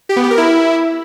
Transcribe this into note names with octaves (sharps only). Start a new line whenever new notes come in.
G4
B3
G4
A#4
E4